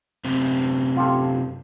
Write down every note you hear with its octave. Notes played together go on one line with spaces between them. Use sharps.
F#2 C3 C4
F4 G4 A4